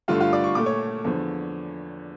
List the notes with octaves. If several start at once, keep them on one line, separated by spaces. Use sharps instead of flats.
G2 D3 A3 F4 F5
F4 F5
D5 D6
C#6
A#2 A3 D6
C#5 C#6
E2 D3 F3